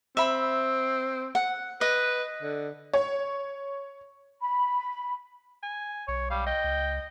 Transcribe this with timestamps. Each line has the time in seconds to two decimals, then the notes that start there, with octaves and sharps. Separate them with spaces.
0.17 C4 E5 B5
1.35 F#5
1.81 B4 D#5
2.42 D3
2.93 C#5
4.41 B5
5.63 G#5
6.08 B1 C#5
6.31 G3 F5
6.47 D#5 G5
6.64 C#2